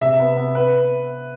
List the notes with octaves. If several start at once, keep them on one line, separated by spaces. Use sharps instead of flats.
C3 E5
B3
B3
B3 B4